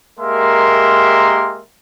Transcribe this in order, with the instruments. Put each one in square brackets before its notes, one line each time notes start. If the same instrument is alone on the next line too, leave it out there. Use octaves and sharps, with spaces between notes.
[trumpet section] G#3 A#3 G4 A#4 E5 C6